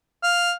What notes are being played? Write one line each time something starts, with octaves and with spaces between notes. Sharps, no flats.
F5